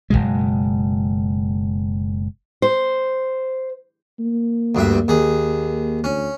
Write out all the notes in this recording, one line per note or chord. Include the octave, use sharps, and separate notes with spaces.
F#1 C#2 B2 G#3
C5
A#3
D2 G2 E5
D#2 G#4
D2 C#4